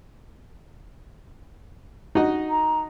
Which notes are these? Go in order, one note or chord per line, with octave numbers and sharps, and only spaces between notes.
D#4 F#4 D#5
A#5